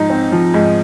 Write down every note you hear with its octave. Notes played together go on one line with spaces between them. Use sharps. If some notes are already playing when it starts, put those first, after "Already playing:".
Already playing: G#2 F3 D#4
C4
F3
G#2